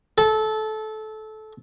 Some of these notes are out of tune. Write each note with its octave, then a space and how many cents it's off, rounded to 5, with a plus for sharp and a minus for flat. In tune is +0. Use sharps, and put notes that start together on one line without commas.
A4 -20